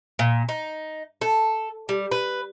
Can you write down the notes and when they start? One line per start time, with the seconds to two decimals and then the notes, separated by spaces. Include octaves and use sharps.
0.19 A#2
0.49 D#4
1.21 A4
1.89 G3
2.11 B4